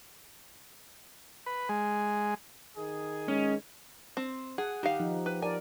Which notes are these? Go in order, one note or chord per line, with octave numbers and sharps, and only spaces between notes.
B4
G#3
D#3 G#4
G#3 C#4
C4
G#4 F#5
D#3 G4 F5
F3 D#4
B4
A#4 D5 G#5